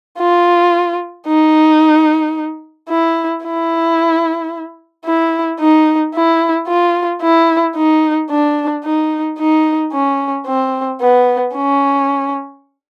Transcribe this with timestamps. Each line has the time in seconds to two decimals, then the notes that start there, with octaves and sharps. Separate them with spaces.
0.19 F4
1.27 D#4
2.90 E4
3.44 E4
5.05 E4
5.60 D#4
6.14 E4
6.68 F4
7.22 E4
7.76 D#4
8.30 D4
8.84 D#4
9.39 D#4
9.93 C#4
10.47 C4
11.01 B3
11.56 C#4